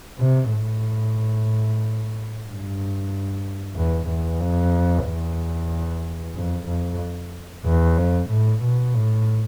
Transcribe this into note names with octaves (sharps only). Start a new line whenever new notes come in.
C3
A2
G2
E2
E2
F2
E2
F2
F2
E2
F2
A2
B2
A2